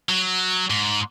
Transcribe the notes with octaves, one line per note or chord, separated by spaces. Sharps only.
F#3
G#2